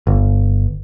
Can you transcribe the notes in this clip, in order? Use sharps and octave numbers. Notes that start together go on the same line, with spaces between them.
G1